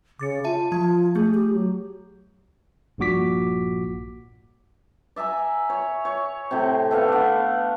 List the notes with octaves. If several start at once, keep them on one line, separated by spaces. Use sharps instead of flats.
C#3 D6 A6 C#7
F4 E5 A5 D#7
F3 F4 A5 G#6
A3 G#4
G4
F#3
A#1 G2 A#2 F#4 D6 B6
D5 E5 G#5 A#5
C#5
C#5
A2 C3
A3 B3 F5
B3 D4